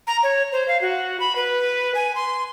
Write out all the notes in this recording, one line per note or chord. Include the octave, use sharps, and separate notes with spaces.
A#5
C#5
C5
F5
F#4
B5
B4
G#5
C6